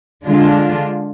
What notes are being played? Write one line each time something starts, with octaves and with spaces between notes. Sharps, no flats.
D3 G#3 D4 F4